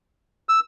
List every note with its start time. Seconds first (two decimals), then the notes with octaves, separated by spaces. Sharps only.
0.49 E6